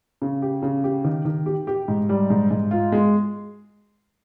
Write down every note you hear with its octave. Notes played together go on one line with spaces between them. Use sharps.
C#3
G4
C#3
G4
D#3
D#3
G4
G4
G#2
G3
G#2
G#2
F4
G#3